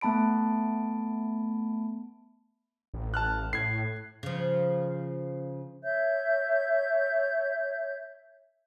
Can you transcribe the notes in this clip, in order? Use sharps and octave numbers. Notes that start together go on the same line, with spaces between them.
A3 B3 A5 B5 D7
A1
A5 F6 F#6
A2 G#6 C7
C#3 F3
C#5 E5 G6